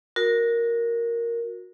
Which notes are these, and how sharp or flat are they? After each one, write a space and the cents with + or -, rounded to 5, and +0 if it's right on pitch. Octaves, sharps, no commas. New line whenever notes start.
F#4 -25 A#4 +0